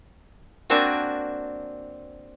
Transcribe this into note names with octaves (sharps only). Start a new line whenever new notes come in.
A#3 C4 D4 F#4 G#5 A5